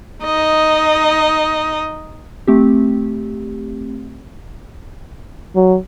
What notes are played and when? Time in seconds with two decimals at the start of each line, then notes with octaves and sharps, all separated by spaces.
0.23 D#4 D#5
2.47 A3 C4 G4
5.56 F#3